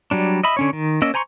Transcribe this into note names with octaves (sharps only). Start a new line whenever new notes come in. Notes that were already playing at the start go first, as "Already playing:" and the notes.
F#3 G3 D4
D#5 E5 B5
D3 C#4 C#5
D#3
A#3 C#4 D#5 E6
C5 G#5 A#5 C6 C#6